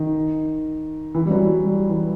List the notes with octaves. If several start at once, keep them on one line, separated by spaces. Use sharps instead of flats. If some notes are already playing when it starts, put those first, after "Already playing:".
Already playing: D#3
E3
G3
F#3
G3
G3
E3